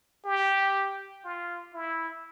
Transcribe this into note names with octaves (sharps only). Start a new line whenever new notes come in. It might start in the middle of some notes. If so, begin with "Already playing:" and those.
G4
F4
E4